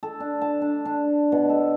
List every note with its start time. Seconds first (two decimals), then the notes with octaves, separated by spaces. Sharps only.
0.03 A4
0.20 D4
0.41 A5
0.62 D4
0.85 D4
1.32 B2
1.50 A4